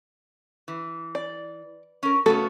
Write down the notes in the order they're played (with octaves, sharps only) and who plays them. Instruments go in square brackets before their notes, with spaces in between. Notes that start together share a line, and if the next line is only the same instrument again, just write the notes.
[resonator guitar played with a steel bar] E3
[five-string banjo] D5
[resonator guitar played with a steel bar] C#4 A#4
[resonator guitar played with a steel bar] C#3 B3 C#4 [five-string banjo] A3 F#4 A4